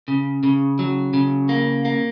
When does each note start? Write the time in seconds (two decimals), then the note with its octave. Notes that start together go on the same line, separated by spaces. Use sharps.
0.08 C#3
0.43 C#3
0.79 F#3
1.14 C#3
1.49 A#3
1.85 A#3